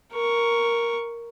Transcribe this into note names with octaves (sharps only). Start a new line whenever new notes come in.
A#4 C#6